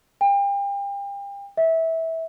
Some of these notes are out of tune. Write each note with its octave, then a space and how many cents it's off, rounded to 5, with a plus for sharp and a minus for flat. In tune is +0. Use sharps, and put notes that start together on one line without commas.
G5 +35
E5 -20